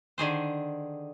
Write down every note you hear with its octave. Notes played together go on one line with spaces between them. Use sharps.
D3 D#3 G#4 C5